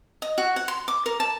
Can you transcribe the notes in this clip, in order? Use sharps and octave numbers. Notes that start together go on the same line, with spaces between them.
D#5
F#4
F#5
C6
D6
A#4
A5